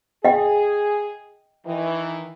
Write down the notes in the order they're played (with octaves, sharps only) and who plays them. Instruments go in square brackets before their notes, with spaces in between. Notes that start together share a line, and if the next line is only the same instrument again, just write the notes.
[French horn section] G#4 [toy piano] D#5 G5
[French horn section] D#3 E3